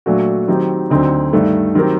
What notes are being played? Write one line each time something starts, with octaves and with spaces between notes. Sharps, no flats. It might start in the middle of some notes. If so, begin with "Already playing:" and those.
A#2 F#3 A3 D4 F#4
D#3 F#3 C4 D#4 G4
D2 D3 F#3 C4 D#4
G2 D#3 A3
D#3 F#3 C4 G4 A#4